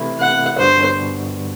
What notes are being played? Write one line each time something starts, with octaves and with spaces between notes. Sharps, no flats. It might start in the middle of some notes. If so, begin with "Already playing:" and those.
Already playing: C3 E3 A3 E4
F#5
G2 D3 G3 B3 F#4 C5